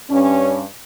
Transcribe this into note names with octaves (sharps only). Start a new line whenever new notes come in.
G2 C#4